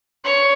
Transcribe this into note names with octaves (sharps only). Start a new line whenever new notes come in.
C#5